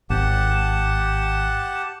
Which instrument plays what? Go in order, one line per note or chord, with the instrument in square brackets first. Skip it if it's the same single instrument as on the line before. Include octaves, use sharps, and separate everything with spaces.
[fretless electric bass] G#1 [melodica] G4 F#5 A5